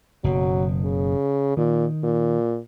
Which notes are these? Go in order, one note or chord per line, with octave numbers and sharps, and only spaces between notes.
F#1 B2 F#3
C#3
A#2 D#3
A#2